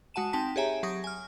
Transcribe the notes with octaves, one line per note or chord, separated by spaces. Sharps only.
G#3 F#4 F#5 A5 D#7 E7
C4 D#4 G5 A5 B6
G4 G#4 C#5 E5 G#5 A#5
F#3 G4 C#6 D#6 A#6
G#5 F6